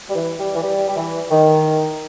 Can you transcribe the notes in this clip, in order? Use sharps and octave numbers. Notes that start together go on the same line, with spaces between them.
G3
E3
G3
E3
G3
G3
E3
D#3